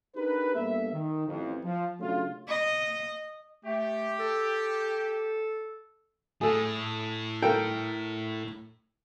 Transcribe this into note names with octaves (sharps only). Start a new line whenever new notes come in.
D4 D#4 G4 G#4 A#4 B4
G2 A#3 B3 A4 E5
D#3
A1 F2
F3
C#3 F#3 A3 D4 F4
D#5
A3 G4
A4
A2 G#4 A4
A4 A#4 G5